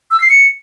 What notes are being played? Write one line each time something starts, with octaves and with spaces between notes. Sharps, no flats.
E6
C7
C#7